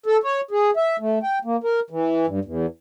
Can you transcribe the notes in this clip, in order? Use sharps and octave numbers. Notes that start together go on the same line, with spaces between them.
A4
C#5
G#4
E5
A3
G5
A#3
A#4
E3
G2
E2